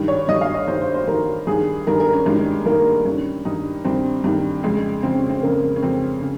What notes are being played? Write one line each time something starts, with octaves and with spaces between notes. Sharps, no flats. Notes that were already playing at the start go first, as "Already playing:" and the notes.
Already playing: G2 D#3
C#5
G2 D#3 D#5
F5
D#5
G2 D#3 C5
C5
C5
G2 D#3 A#4
G2 D#3 G#4
G2 D#3 A#4
A#4
C#4
G2 D#3 G#3
G2 D#3 A#3
G2 D#3 C#4
G2 D#3 D#4
G2 D#3 C4
G2 D#3
F2 C#3 G#3
F2 C#3 C4
C#4
C4
F2 C#3 A#3
C#4
F2 C#3 C4
C#3